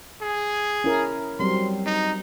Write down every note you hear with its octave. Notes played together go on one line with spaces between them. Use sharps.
G#4
C#4 E4 A#4
F#3 G3 C4 C6
D#4